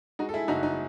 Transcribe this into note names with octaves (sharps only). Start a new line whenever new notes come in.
G#3 D#4 F#4
A4
E4 G#4
F#1 D#4 F#4
D#4